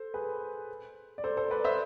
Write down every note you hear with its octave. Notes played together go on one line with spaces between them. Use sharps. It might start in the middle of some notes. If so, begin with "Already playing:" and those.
Already playing: A4 C5
G#4 B4
D5
A4 C5
A4 C5
B4 D5
C5 E5